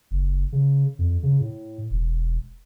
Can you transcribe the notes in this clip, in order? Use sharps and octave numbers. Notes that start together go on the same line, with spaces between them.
F#1
C#3
F2
C#3
A2
E1